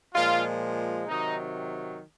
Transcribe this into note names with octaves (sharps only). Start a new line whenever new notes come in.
A#2 F3 G#3 F4
C3 D#3 F#3 D#4